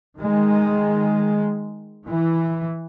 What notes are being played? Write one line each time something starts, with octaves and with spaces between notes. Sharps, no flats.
D#3 G#3
E3